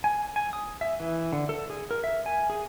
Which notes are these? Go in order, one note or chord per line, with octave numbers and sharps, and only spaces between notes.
G#5
G#5
D#6
E5
E3
D3
A4
G#4
A#4
E5
G#5
G#4